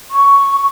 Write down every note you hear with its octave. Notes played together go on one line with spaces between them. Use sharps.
C#6